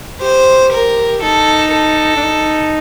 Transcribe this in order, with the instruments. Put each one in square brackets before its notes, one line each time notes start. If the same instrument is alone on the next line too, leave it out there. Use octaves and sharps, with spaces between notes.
[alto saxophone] G4 [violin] C5
[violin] A#4
[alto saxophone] D#4 [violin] A4
[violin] A4
[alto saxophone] D4
D#4